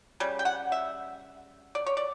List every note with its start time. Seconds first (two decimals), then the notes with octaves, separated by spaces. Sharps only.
0.20 C#3 G3
0.39 G5
0.45 F#5
0.72 E5
1.75 D5
1.86 C#5
1.97 D5